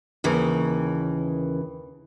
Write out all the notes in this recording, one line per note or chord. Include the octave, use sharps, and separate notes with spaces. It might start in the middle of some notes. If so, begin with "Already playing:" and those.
D#2 C#3 E3